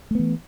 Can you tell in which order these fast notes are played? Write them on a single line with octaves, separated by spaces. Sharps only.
A3 B3 E3